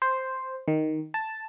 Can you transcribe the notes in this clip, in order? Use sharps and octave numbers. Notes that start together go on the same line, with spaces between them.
C5
D#3
A5